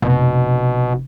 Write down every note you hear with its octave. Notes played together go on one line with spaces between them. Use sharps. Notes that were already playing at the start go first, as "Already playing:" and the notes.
F1 B2